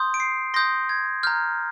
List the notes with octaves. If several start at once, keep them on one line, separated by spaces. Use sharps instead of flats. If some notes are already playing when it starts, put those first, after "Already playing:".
Already playing: C6 D#6 G6
D7
C7
C6 D#6 G6 A#6
G#6
A#5 F6 G6